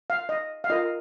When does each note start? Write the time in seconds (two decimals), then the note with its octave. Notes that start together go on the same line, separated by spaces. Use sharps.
0.10 F5
0.29 D#5
0.64 F5
0.70 F4 A#4 D#5